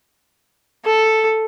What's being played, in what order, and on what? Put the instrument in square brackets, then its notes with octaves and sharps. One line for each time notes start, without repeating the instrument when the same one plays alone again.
[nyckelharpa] A4